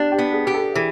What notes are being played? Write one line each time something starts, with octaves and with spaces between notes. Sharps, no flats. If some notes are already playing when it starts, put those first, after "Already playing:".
Already playing: D4 G4
G4
B3
G#4
G4
A4
E3 G#4